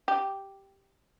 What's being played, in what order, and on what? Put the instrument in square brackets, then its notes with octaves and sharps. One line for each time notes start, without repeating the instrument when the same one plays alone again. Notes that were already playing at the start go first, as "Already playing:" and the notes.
[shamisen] G4